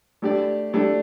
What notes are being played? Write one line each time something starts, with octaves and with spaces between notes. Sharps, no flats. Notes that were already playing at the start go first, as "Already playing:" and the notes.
A3 D4 G4 D5
A3 D4 G4 D5